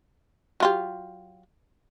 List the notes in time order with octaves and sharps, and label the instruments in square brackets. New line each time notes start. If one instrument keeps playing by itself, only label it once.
[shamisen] F#3 F4 G4